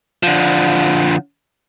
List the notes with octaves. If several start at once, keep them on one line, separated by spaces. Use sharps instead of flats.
D3 F3